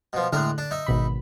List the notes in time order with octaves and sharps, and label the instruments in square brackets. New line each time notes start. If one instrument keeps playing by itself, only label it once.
[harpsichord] B2 F3
[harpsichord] A2 G#3 A#4 [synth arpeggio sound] D3 F#6
[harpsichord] D4
D#4 E5
[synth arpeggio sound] G#1 B2 B5